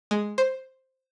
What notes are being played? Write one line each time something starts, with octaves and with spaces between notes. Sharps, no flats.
G#3
C5